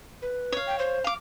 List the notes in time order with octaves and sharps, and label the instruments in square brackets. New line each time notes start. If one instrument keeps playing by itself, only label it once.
[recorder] B4
[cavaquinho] C#5 F5
[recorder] G5
C5
[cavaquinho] F5 D6